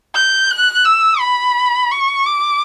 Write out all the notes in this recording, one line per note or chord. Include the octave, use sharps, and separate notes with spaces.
G6
F#6
E6
B5
C#6
D6